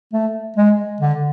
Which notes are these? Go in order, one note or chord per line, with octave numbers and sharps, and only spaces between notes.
A3
G#3
D3